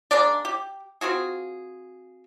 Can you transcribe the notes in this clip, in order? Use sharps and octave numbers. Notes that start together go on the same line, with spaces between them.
G#3 A#3 D4 D5
G4
C4 F4 F#4 G#4